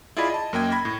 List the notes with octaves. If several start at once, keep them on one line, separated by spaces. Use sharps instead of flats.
E4 F4 G#4 D5 D#5 B5
D#5 A5
F#2 A#3 D#5 G5 G#6
B5 G#6 A#6
A2